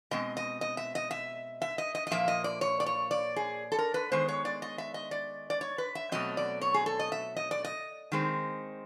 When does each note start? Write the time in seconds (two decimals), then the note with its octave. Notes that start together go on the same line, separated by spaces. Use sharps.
0.11 B2 G#3 C4 D#5
0.37 D#5
0.61 D#5
0.77 E5
0.95 D#5
1.11 E5
1.62 E5
1.78 D#5
1.95 D#5
2.07 D#5
2.11 A#2 F3 A#3 E5
2.28 D#5
2.44 D5
2.61 C#5
2.80 D5
2.86 C#5
3.11 D5
3.36 G#4
3.72 A4
3.78 A#4
3.94 B4
4.11 D#3 G#3 B3 C5
4.29 C#5
4.45 D5
4.62 D#5
4.78 E5
4.94 D#5
5.11 D5
5.50 D5
5.61 C#5
5.78 B4
5.95 E5
6.12 B2 F#3 A3 C4 D#5
6.37 D5
6.61 C#5
6.74 G#4
6.86 A4
6.99 D#5
7.12 E5
7.36 D#5
7.51 D5
7.65 D#5
8.12 D#3 G#3 C4